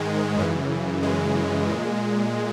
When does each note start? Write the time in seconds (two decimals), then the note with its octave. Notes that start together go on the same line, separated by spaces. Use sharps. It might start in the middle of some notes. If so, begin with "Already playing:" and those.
Already playing: G#2 D#3 G#3
0.36 F#2 C#3 E3
1.03 G#3
1.70 A#2